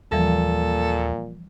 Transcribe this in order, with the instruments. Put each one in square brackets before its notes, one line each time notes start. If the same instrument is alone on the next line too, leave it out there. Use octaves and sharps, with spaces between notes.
[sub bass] D#2 [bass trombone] A#2 [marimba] E3 F3 G3 [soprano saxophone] A4